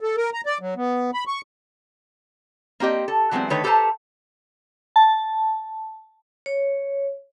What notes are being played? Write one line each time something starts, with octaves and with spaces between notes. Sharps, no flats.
A4
A#4
A#5
D5
F#3
B3
B5
C#6
A#3 C4 G4 D#5
A4
E3 F#3 G#3 A3 B3 C4
D3 D#3 A3 B4 C#5
G4 A4 B4 C5 A5 A#5
A5
C#5